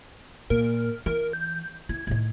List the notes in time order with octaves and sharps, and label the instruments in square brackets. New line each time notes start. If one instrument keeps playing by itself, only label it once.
[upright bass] A#2 [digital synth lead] A#4
[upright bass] E3 [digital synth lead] A#4
[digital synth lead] G6
[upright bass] E4 [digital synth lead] G#6
[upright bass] A2 D#3